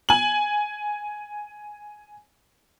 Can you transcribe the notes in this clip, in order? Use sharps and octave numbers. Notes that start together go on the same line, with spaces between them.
G#5 F#7